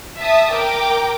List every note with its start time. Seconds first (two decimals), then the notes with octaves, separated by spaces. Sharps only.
0.17 E5 A5 D#6
0.52 A#4 G5 D6